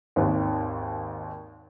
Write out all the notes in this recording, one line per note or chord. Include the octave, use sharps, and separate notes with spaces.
G#1 D#2